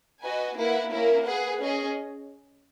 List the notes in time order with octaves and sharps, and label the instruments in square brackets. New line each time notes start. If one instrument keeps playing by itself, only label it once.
[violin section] F#4 B4 D#5 G#5
A#3 E4 B4 F#5
A#3 C#4 E4 A#4
G#4 B4 F#5
C#4 G#4 D#5